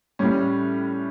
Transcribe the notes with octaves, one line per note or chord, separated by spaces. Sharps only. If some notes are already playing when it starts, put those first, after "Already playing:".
A2 G3 C#4